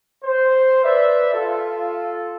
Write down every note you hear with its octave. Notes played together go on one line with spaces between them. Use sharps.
C5
B4 D5 E5
F4 A4